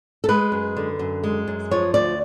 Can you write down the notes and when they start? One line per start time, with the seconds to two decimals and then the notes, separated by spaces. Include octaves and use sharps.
0.24 A4
0.29 G#3 B4
0.52 F#2
0.77 D3
0.99 F#2
1.24 G#3
1.48 F#2
1.71 F3 C#5
1.94 D2 D5